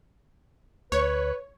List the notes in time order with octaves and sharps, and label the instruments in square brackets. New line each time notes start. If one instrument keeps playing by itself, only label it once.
[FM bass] D2 [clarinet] B4 [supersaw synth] C#5